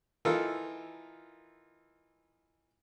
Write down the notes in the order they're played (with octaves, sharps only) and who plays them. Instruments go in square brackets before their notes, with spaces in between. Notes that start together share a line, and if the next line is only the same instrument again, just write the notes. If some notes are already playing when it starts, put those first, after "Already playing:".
[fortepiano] E3 D#4 F4 A4 A#4